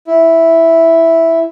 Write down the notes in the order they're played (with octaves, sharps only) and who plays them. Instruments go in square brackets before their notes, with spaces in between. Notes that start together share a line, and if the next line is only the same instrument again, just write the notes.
[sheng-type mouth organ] E4